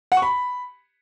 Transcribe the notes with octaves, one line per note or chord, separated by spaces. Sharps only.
F#5
C#6
B5